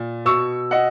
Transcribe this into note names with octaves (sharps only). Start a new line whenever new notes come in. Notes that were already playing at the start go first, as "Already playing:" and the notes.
Already playing: A#2
B2 C#6 E6
D#5 F#5